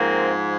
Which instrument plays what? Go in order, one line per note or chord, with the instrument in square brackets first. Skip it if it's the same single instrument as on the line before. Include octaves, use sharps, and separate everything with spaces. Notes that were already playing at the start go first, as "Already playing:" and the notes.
Already playing: [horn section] G#2 F3 A#3 C4